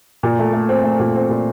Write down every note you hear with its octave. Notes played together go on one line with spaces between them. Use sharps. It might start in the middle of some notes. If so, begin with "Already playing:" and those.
A#2
A3
A3
C4
A3
A#2
C4
A#2